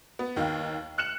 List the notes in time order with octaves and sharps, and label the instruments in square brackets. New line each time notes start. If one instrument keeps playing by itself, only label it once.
[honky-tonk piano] B3
D#2 D#3 F5
F6 F#6 C#7 E7 F#7